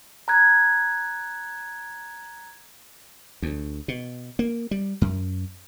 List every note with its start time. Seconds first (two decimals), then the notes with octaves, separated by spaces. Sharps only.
0.28 A#5 F#6 G#6
3.42 D2
3.88 B2
4.39 A#3
4.71 G3
5.01 F#2